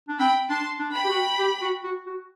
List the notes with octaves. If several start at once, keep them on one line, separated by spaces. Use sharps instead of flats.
D4
C4 G5 B5
D4 A5 C6
D4
G5 B5
G4
F#4
G4
F#4
F#4
F#4